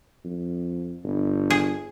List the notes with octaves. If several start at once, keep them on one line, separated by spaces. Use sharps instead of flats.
F2
G1
G#4